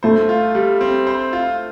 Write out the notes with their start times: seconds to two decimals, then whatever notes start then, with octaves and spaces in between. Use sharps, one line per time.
0.03 A3 C5
0.29 F4
0.55 G3
0.81 C4
1.07 C5
1.33 F4